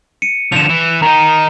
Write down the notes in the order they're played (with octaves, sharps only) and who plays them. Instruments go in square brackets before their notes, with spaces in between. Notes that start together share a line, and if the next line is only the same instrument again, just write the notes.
[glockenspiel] C#7 D#7
[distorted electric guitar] D2 F3 [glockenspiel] E7 F7
[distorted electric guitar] E3
[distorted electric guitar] D#3 D#4 [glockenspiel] A#5